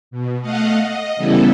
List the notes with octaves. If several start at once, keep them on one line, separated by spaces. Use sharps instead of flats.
B2
A3 D#5 F5 F#5
D#5
C#3 E3 G3 B3 E4 A4